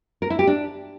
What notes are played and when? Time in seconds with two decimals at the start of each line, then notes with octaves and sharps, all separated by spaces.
0.22 A#4
0.30 E4
0.39 G4
0.47 D4